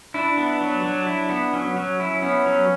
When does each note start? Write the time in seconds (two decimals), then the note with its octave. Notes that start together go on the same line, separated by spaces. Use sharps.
0.14 D4 E4
0.37 B3
0.61 F#3
0.83 F#3
1.07 E4
1.29 B3
1.53 F#3 C#4
1.76 F#3
2.00 E4
2.22 B3 C#4
2.46 F#3